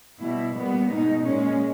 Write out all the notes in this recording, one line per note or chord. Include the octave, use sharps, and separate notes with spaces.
B2 G3 E4
A#2 G3 B3
B2 G#3 D#4
A#2 G#3 C#4